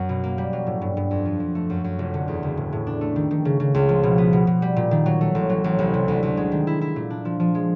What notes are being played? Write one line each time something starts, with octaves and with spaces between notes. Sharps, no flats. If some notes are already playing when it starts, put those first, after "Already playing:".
Already playing: F#2 F#3
B2
A#3
G3
F#3
A2
G2
G2
F2
F3
F3
A3
F#2
F#2
F1
D3
E2
F#1
A2
A2
D4
A3
D#3
D#3
C#3
C#3
C#2
F3
B2
B3
B2
B2
G3
A#2
D#3
F#3
A3
A1
F#3
A1
C2
C3
D2
D2
G#3
D#3
E4
E4
A#2
D4
F3
F3
G#3